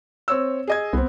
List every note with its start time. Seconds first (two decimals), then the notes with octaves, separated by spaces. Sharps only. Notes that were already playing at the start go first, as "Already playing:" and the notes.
0.28 C4 C#5 E6
0.67 G#4 D#5 G#6
0.93 C2 B3 C4